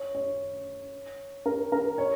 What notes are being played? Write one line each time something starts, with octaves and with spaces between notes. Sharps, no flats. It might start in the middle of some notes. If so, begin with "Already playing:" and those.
Already playing: C#5
C#5
A#4
A#4
C#5